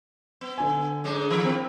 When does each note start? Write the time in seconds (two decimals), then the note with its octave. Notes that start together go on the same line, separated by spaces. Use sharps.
0.41 B3
0.58 D3 G#5
1.04 G#2 G#3 C#4
1.30 D#3 F3 A#4
1.44 C4